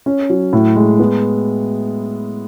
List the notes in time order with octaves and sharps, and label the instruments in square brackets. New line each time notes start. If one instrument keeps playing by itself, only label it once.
[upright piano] C#4
F#3
A2
G#3
B3